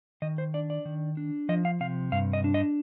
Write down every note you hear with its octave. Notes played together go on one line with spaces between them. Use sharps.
D#3 D#5
C5
D4 D5
D5
D#3
D4
F3 D#5
F5
C3 F5
G2 F5
D#5
D4
D#5